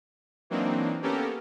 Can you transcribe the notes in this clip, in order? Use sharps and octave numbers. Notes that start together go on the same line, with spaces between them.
E3 F#3 A#3 C4 D4 D#4
A#3 B3 C#4 G4 A4 A#4